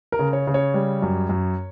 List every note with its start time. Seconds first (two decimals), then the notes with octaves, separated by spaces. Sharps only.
0.12 A#4
0.19 C#3
0.33 C#5
0.47 C#3
0.54 C#5
0.74 G3
1.02 F#2
1.29 F#2